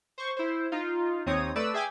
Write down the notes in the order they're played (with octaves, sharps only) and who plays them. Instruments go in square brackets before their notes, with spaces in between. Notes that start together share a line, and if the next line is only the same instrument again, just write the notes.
[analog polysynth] C5 C#6
E4 C5
D#4 F4
D#2 C4 D#4 C#5 D#6
A3 B4 D5 E6
G#4 E5 G5 G#5 D6 G#6